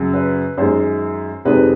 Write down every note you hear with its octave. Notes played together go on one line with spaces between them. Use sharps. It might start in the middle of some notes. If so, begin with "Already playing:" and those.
Already playing: F#2 C#3 F#3
B4
F#2 D#3 G#3 C5
F2 C3 D#3 G#3 C4 B4